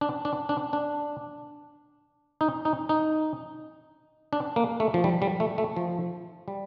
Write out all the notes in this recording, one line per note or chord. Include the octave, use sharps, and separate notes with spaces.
D4
D4
D4
D4
D#4
D#4
D#4
D4
A#3
A3
F3
G3
G3
A3
A3
F3
G3